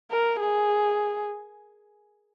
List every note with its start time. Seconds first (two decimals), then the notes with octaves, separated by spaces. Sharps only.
0.11 A#4
0.40 G#4